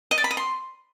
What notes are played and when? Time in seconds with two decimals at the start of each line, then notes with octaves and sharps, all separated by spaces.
0.11 D#5
0.18 D5
0.24 B5
0.31 D#5
0.37 C6